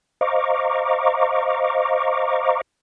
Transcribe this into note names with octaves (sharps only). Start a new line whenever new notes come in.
C5 D#5 F5 A#5 C#6 D6